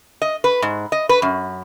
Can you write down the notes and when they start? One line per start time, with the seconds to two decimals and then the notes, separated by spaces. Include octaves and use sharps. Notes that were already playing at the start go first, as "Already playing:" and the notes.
0.22 D#5
0.44 B4
0.62 G#2
0.92 D#5
1.09 B4
1.22 F#2